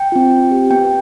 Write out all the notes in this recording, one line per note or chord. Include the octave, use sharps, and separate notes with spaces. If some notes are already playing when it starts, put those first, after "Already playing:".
Already playing: G5
C4 F4
C4
G4
B3 G5
B4